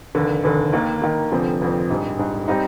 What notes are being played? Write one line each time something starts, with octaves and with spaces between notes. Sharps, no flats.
F1 D#2 D3
F1 D#2 D3
D#2 D#3 A#3
D#2 D#3 A#3
F1 F2 D3 F3 C4
F1 F2 D3 F3 C4
A#1 G#2 G3
A#1 G#2 G3
G3 C4 D#4